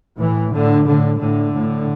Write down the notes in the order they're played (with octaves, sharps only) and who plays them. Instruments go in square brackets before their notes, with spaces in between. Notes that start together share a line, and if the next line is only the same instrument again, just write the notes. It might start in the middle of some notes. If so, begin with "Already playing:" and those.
[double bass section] A2 E3
A2 D3
A2 D3
A2 D3
A2